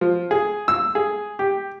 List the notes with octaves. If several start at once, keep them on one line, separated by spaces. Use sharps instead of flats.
F3
G#4
E6
G#4
G4